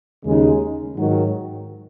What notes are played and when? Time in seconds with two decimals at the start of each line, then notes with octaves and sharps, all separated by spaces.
0.24 D#2 C#3 G#3 D#4
0.97 G#2 D#3 F#3